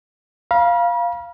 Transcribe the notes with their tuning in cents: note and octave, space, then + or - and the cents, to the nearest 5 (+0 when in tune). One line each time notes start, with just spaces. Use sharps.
F5 -5 B5 -45